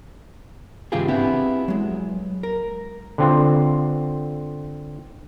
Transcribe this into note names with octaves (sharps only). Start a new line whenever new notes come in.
G#2 C#3 E3 F4 G4 G#4
B3 C4 D4 E4 G4
F#3 G#3
A#4
D3 C4 F4